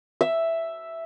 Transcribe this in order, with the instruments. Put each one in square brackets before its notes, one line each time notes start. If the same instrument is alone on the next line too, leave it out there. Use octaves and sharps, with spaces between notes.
[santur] E5